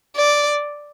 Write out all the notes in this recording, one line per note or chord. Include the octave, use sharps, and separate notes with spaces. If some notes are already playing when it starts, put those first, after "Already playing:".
D5